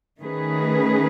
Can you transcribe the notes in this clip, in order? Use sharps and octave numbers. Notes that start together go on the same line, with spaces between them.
D#3 A3 C#4 G#4 B4